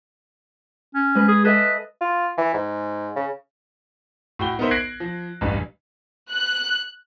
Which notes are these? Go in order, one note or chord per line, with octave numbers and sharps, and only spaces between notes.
C#4
G#3 B4
G#4
A4 B4 D#5 E5
F4
E3
G#2
C#3
A2 F#4 G5 G7
B3 D#4 A#4 C5 E5
F#6 G#6 A#6 C7 D7 F#7
F3
A1 E2 G2
F#6